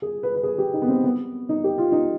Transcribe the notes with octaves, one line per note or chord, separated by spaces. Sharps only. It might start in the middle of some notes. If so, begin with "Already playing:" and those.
G#4
B4
B4
G#4
G4
D#4
B3
C4
B3
D#4
G4
F4
D#4